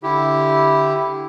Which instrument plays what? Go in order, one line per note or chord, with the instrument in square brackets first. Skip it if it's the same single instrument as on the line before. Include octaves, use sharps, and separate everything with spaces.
[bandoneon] D3 E4 G4